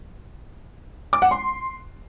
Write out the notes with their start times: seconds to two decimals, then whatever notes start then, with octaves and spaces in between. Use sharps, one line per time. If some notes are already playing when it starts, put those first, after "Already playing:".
1.13 D6
1.22 F#5
1.31 C6